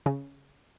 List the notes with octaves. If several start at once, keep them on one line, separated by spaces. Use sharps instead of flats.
C#3